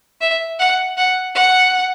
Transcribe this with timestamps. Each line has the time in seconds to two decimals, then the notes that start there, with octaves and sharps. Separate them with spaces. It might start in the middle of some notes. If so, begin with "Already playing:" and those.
0.21 E5
0.60 F#5
0.98 F#5
1.35 F#5